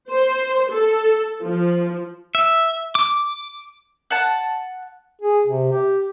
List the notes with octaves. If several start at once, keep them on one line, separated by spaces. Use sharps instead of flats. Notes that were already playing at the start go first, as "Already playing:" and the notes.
C5
A4
F3
E5
D6
F#5 A5
G#4
C3
G4